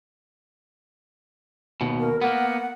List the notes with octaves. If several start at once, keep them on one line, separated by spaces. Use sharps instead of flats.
D#2 B2
A#4
A#3 B3 F#5